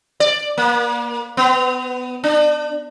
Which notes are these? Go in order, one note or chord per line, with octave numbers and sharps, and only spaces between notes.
D5
A#3
B3
D4